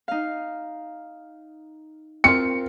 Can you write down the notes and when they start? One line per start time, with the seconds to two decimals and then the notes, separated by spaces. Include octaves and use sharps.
0.08 D#4 F5
2.24 C4 F4 A#4 C#7